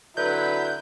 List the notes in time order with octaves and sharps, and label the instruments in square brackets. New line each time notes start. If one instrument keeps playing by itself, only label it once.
[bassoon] D3 [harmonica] F#3 E4 [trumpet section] B4 [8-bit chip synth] G6